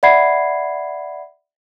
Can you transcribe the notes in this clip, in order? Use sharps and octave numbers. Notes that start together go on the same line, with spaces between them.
D5 E5 F#5 B5 G#6 C7